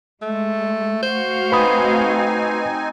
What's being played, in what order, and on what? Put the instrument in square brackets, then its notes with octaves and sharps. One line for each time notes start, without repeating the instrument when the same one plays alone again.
[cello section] G#3 [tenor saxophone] A3
[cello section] A3 F#4 F5 [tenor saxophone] C5
[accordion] C4 D#4 G#5 [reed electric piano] B4 B5 D#6